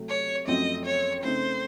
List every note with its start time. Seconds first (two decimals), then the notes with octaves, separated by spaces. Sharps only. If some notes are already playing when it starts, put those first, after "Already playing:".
Already playing: C3 F#3 A3
0.09 C#5
0.47 F#2 F3 A3 C4 F#4 D#5
0.86 C#5
1.24 C#3 A3 C4 D#4 C5